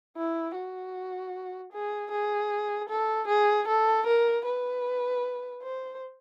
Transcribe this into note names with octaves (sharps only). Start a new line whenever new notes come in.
E4
F#4
G#4
G#4
A4
G#4
A4
A#4
B4
C5